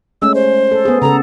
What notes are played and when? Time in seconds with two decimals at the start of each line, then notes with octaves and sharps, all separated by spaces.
0.22 G#3 A3 C#4 E6
0.34 C5
0.72 A4
0.85 B3 G#4
1.02 C#3 A4 A#5